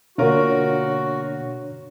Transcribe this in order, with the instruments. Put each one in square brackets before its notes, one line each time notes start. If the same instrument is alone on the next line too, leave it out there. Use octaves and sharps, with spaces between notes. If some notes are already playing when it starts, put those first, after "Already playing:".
[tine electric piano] B2 D3 [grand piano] A#3 F4 A#4 [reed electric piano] D4 C#5 [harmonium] F#4